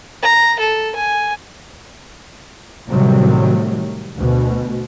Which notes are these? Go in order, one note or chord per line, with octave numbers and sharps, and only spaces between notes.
A#5
A4
G#5
A2 C3 D#3 F#3 G3 A3
D2 B2